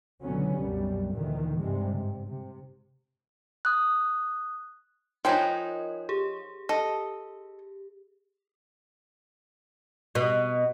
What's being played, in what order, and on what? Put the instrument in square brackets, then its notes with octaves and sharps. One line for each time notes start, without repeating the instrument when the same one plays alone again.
[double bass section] C#2 B2 D3 F#3 B3 C#4
C2 F#2 B2 G3
D2 A#2 D#3 E3
G2 C3 G3 G#3
G#2 C3
C3
[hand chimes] D#6 F#6
[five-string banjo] F3 D#4 [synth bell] A#4 C#5 D#5 [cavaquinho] G5 G#5 B5
[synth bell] G4 G#4
[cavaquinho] A4 [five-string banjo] D#5
[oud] B2